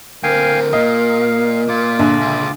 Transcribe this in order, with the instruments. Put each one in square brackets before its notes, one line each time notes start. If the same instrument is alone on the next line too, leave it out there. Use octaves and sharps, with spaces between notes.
[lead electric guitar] D2 C4 [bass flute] A#4 [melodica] F5 G5 G#5
[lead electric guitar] A#2 [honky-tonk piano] D#5 [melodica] F5
[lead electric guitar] A#2 [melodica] F4 D6
[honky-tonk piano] A#1 D3
[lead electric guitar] C#2